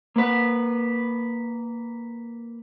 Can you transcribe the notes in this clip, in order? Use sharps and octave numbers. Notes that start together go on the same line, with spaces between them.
A#3 B4